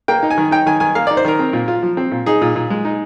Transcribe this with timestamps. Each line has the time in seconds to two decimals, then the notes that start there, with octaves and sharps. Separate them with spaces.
0.08 A#3 G5
0.23 D#4
0.31 G#5
0.38 D#3
0.51 D#4 G5
0.66 D#3 G#5
0.80 D#3 G#5
0.95 A#3 F5
1.07 D#4 D5
1.17 C5
1.25 D#3 A#4
1.39 C4
1.53 A#2
1.68 F4
1.83 F3
1.97 C4
2.12 A#2
2.26 D#4 G#4
2.42 A#2
2.56 A#2
2.70 G#3
2.85 D#4